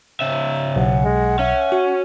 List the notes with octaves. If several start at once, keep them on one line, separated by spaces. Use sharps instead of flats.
C#3 E5
B1 F#5
G#3
C#4 E5
F#4